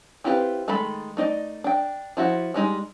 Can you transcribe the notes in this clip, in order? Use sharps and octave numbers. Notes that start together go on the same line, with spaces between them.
C4 E4 F4 G4 B4
D#3 G#3 A3 A4 B5
A3 D#4 D5 D#5
D4 G5
F3 E4 F#4
G3 G#3 D#4